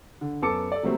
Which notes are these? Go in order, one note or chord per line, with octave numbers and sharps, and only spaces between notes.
D3
F#2 B3 A4 A5 D6 C#7
A4 D5
F#3 G3 A3 A#3 C4